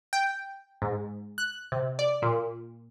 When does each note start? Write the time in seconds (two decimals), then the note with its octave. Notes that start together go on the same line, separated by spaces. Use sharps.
0.13 G5
0.82 G#2
1.38 F#6
1.72 C3
1.99 D5
2.22 A#2